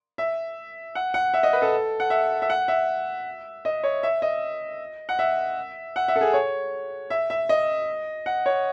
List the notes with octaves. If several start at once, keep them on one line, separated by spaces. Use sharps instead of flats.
E5
F#5
F#5
E5
D#5
B4
A4
F#5
E5
E5
F#5
E5
D#5
C#5
E5
D#5
F#5
E5
F#5
E5
A4
G#4
C#5
E5
E5
D#5
F#5
C#5